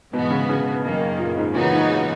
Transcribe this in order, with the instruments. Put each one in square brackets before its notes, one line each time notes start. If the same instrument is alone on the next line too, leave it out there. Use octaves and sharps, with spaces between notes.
[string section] G#2 E3 B3 F#4 [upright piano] B2
[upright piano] C#3
C#3
[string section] F#2 D#3 A#3
[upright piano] A#2
G#2
[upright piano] A#2 [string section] C#3 E3 B3 D#4 F#4
[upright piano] G#2